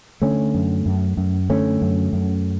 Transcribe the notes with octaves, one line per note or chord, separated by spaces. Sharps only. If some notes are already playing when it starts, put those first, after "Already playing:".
D3 A3 C#4
F#2
F#2
F#2
D3 A3 C#4
F#2
F#2